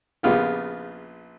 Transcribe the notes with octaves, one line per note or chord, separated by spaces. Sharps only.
A#1 C#3 B3 F4 G4